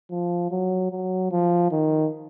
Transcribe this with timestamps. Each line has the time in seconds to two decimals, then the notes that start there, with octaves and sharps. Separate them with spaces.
0.11 F3
0.51 F#3
0.91 F#3
1.31 F3
1.72 D#3